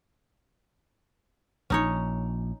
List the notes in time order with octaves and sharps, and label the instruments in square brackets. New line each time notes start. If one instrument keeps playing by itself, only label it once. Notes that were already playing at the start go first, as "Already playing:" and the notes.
[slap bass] A#1 [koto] C#4 D#4 C#5